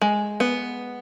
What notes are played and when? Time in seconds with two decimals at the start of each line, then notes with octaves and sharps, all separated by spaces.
0.01 G#3
0.40 B3